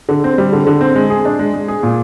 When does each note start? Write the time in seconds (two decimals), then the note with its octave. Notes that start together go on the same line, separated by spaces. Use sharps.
0.09 D3
0.24 C4
0.38 G3
0.53 D3
0.67 D3
0.81 C4
0.96 G#3
1.10 G#4
1.25 D4
1.39 G#3
1.54 G#3
1.68 G#4
1.83 A#2